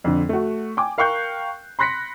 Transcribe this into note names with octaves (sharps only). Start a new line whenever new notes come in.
F2 D3
A3 F#4
G5 G#5 D6
A#4 F5 G5 C#6 F#6 G6
B5 C6 F#6 A#6 B6 C#7